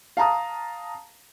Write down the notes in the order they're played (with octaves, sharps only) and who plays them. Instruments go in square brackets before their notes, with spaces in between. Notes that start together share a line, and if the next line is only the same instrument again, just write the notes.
[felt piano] F5 A5 A#5 D#6